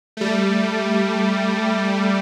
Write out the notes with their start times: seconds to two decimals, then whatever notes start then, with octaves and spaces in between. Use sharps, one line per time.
0.17 G3 A3